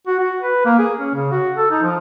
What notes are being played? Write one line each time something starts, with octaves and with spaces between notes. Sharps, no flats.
F#4
F#4
B4
A#3
G#4
C#4
C#3
F#4
A4
D#4
F3